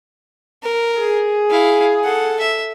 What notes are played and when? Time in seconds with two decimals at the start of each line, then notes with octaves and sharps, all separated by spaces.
0.63 A#4
0.97 G#4
1.50 E4 F5
2.03 A4 F#5
2.40 E5